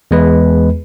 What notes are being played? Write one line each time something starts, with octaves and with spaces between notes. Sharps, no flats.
E2 G#3 B4